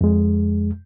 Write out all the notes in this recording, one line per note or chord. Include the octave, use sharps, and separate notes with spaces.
F2 G#3